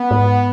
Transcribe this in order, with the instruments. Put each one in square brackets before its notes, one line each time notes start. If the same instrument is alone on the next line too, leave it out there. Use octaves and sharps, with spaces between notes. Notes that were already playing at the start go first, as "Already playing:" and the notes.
Already playing: [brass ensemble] B3
[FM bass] G#2